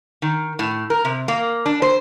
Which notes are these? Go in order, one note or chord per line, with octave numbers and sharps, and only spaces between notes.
D#3
A2
A#4
C3
A#3
D4
C5